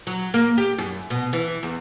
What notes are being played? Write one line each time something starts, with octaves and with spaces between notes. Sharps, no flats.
F#3
A#3
G4
F#2
B2
E3
E2